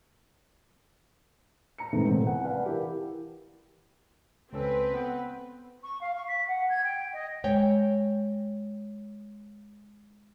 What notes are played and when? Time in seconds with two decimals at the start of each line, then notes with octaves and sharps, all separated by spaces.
1.78 A#5 C#7
1.93 C3 D#3 E3 G#3 A3 C4
2.05 D#1 A1 F#2 C3 B3 C4
2.27 F#5 G#5
2.43 B4 D5 F5 F#5 A5
2.66 E3 E4 G4 A#4
4.53 C#2 C4 C#4 A4 B4
4.94 B3 F#5 G5
5.83 C#6
6.01 F5
6.15 C#6
6.28 B6
6.48 F#5
6.69 G#6
6.84 G5
7.13 D#5
7.44 G#3 C#5 G5